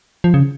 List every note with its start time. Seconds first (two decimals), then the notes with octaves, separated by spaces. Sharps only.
0.24 F3
0.34 C#3